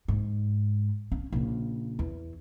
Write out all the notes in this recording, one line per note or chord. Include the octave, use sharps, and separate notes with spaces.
G#2
C#4
A#1 C#3
E2